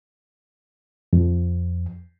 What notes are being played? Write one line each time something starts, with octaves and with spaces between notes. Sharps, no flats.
F2